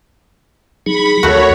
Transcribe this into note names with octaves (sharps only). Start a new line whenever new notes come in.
F#3 D#4 G#4 B5
D#2 A3 F#4 A#4 C#5